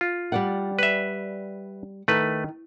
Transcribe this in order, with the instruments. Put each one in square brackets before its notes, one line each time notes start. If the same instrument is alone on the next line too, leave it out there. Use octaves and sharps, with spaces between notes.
[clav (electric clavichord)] F4
[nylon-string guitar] G3 D5 F#5
[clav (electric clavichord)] B4 E5
[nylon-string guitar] D#3 [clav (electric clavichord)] A3 B4